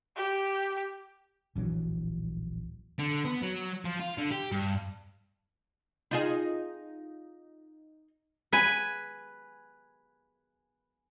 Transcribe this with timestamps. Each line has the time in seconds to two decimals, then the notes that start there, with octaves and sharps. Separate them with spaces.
0.16 G4
1.55 D1 A#1 E3 F#3
2.99 D3
3.25 B3
3.42 F#3
3.85 F3
3.99 F4
4.18 D3
4.31 G4
4.52 G2
6.11 D#4 F4 G#4
8.53 B4 G#5